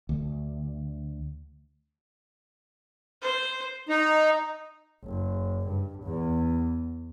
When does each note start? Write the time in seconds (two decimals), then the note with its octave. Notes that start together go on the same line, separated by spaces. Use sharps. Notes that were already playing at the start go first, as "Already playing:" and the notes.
0.09 D2
3.22 C5
3.89 D#4 A#5
5.03 F#1
5.67 G2
6.03 E2